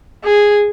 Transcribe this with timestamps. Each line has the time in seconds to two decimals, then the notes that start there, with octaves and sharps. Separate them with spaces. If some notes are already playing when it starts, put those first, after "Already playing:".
0.24 G#4